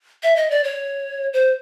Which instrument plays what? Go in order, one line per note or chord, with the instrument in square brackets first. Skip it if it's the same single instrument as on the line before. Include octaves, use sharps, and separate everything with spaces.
[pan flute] E5
D#5
D5
C#5
C5